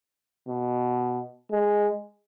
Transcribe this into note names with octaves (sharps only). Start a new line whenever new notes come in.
B2
G#3